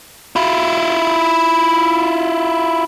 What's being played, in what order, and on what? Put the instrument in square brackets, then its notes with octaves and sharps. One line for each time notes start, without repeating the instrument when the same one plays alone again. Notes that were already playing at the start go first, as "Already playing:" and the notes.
[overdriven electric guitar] E4 F4